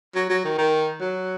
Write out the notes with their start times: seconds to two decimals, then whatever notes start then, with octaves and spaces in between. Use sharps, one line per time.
0.15 F#3
0.30 F#3
0.44 D#3
0.58 D#3
1.00 F#3